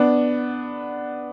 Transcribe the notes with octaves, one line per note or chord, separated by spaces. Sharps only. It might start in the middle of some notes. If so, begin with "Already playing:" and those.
Already playing: B3 D4